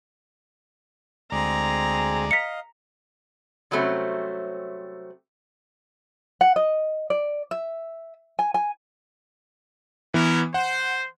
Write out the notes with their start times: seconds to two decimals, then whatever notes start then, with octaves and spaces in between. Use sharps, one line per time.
1.32 D2 G#3 C4 G#4 D5 A#5
2.31 D#5 F5 B6 C#7
3.71 C3 F#3 G3 A3 C4 C#4
6.41 F#5
6.56 D#5
7.10 D5
7.51 E5
8.39 G#5
8.54 G#5
10.14 E3 B3 C#4 E4 A#4
10.54 C5 F#5